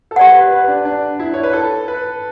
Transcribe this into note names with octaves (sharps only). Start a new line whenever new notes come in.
A4
G4 B4 D5 F#5
B4
B4
D4
D4
E4
C#5
B4
A4
B4